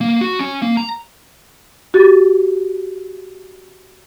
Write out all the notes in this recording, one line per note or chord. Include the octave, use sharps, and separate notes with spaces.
A#3
F#4
C#4
A#3
A#5
F#4 G4 A6